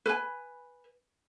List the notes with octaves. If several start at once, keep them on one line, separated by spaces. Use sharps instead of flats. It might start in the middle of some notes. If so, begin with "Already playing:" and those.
B4 G#5